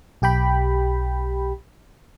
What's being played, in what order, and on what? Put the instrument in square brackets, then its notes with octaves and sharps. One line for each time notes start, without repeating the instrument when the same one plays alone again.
[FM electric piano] B1 G4 G5 B5